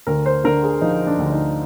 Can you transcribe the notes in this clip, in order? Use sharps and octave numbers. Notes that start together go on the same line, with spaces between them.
D2 A#4
C5
D3 A#4
G#4
F3 D#4
D4
D2
D#4